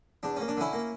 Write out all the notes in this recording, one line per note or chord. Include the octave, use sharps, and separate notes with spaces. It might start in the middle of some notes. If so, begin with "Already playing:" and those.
E2 D4
A#3 C#4
D4
D3 C#4 E4
A#3